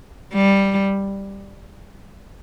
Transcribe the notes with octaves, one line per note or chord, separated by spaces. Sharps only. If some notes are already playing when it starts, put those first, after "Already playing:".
G3